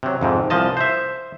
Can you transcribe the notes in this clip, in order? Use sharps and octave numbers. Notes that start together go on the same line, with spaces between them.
C3 F#3
F2 G#2 C3
C2 E3 F3 D#5 A5
C5 E5